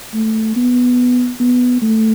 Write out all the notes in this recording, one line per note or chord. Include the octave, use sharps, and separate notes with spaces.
A3
B3
B3
A3